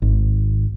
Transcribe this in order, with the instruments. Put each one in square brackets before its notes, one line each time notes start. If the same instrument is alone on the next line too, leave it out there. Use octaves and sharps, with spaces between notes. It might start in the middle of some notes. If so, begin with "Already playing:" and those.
[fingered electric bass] G#1